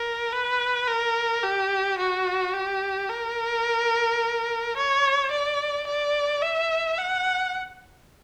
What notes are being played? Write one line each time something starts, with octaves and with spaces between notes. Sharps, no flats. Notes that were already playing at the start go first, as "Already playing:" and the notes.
Already playing: A#4
B4
A#4
G4
F#4
G4
A#4
C#5
D5
D5
E5
F#5